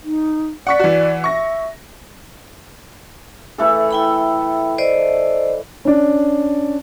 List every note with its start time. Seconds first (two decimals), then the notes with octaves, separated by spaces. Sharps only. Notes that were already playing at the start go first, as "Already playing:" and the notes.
0.04 D#4
0.67 D5 F#5 C#6 B6
0.79 E3 F#4
1.24 E5 C#6 A#6
3.58 E3 A3 A4
3.91 E4 G5 B5
4.78 C5 D5 D#5
5.85 C#4 D4